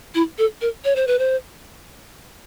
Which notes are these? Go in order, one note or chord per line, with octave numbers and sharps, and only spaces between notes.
E4
A4
A#4
C#5
C5
B4
C5